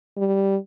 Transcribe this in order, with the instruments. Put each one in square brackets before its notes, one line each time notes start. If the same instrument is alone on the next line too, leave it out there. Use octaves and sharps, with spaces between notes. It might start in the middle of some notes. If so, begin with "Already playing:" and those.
[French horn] G3